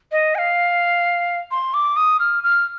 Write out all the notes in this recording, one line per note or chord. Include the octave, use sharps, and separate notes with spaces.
D#5
G#5
F5
C6
D6
D#6
F6
F6